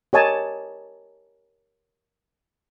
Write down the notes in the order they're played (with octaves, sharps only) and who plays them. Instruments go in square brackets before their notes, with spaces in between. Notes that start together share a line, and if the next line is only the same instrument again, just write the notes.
[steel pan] G4 A#4 C#5 D#5 G#5 A5